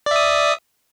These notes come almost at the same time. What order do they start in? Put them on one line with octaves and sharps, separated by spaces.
D5 E5 D#6